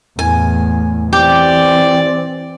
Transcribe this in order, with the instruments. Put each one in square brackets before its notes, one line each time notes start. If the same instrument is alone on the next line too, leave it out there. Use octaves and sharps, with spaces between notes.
[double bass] E2 A2 [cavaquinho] G#5
[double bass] E3 C4 [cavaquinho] G4 G5 D6 [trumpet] D5